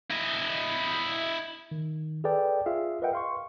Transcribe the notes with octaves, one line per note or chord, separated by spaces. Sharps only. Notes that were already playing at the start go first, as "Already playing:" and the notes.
E4 D#5
D#3
G#4 A4 B4 D5 G5
F4 G#4 E5 F5
A#4 B4 D#5 E5 F#5 G5
F5 C6 C#6